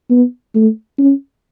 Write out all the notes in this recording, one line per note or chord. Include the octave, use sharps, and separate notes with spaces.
B3
A3
C#4